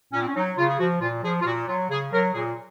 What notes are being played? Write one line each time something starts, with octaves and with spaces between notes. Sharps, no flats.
A#2 C#4
C4
C#4
F#3 D#4
C#3 F4
G#4
F3 F#4
A#2 F4
F3 G#4
F4
A#2 F#4
F#3 F4
C#3 G#4
F#3 A#4
A#2 G#4